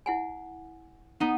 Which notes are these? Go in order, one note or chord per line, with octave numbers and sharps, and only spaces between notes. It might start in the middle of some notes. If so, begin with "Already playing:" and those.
E4 F#5 G#5
B3 D#4